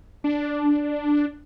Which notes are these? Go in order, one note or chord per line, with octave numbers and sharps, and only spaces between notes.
D4